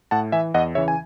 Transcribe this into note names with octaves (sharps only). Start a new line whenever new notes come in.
A2 F#5 A5
E3 E5 G#5
E2 D#5 F#5
C#3 E3 C#5 E5
G#5